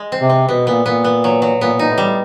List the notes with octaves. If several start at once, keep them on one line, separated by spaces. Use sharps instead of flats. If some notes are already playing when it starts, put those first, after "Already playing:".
Already playing: G#3
C4
C3
C4
B2 B3
A#2 B3
A#2 B3
B3
F#3
F#3
A#2 B3
A#2 D#4
A2
G3
A2